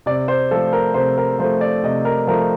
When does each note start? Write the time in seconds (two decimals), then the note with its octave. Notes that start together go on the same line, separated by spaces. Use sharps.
0.06 C3 D5
0.28 C5
0.51 F3 A3 A4
0.73 A#4
0.94 C3 C5
1.18 A#4
1.39 F3 C5
1.44 A3
1.61 D5
1.83 C3 D#5
2.05 A#4
2.27 F3 A#4
2.31 A3